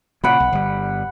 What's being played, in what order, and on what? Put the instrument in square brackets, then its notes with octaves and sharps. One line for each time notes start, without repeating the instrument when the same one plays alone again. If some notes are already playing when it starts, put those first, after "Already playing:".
[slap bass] A#2 C#3 [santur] F#5 B5
[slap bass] B1
G1 G3